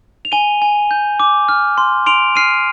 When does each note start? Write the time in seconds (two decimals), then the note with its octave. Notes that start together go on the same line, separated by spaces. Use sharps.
0.25 F7
0.32 G#5 D#7 G7
0.62 G#5
0.91 G6
1.20 D6
1.49 F6
1.78 C6
2.06 C6 D7 F7
2.35 F6 C7 D#7